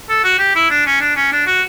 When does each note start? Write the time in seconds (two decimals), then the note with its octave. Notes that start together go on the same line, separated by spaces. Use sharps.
0.09 A4
0.24 F#4
0.39 G4
0.55 E4
0.70 D4
0.86 C#4
1.00 D4
1.16 C#4
1.32 D4
1.46 F#4